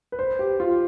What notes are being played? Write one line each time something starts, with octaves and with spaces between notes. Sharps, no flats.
B4
C5
G4
F4